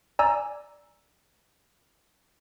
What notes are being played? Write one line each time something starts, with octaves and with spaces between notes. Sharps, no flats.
D5 G#5 A#5 E6